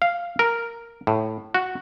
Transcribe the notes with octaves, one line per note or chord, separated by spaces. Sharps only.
F5
A#4
A2
F#4